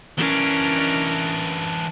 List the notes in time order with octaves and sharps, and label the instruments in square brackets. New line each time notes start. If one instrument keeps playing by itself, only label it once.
[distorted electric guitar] E3 D4 [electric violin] C#4 A#4